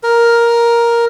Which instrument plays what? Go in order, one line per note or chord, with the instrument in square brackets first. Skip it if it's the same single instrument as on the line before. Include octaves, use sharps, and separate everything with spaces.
[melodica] A#4